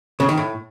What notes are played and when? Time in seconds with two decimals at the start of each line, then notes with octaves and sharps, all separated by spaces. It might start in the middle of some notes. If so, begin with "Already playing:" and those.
0.20 C#3
0.29 D#3
0.37 A2